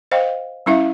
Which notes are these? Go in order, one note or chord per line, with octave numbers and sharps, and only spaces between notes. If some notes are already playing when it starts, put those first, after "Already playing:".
C5 D#5 F5 G5
G3 C#4 E4 E5 F5